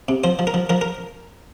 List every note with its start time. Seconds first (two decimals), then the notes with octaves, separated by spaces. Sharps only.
0.08 C3
0.24 F3 C5
0.39 F3
0.47 A#4
0.54 F3
0.69 F3 A#4
0.81 A#4